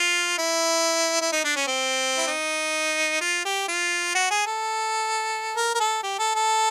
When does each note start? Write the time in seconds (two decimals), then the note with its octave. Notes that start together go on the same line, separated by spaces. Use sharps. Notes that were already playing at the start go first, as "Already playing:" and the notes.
Already playing: F4
0.38 E4
1.21 E4
1.32 D#4
1.44 D4
1.56 C#4
1.67 C4
2.17 E4
2.27 D#4
3.21 F4
3.45 G4
3.68 F4
4.15 F#4
4.31 G#4
4.47 A4
5.56 A#4
5.75 A#4
5.80 A4
6.03 G4
6.19 A4
6.35 A4